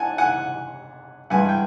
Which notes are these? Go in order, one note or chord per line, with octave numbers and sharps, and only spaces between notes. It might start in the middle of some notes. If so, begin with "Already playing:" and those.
Already playing: F#5 G#5 A5
F#5 G#5
G2 E3 G#3 F#5 G#5
G5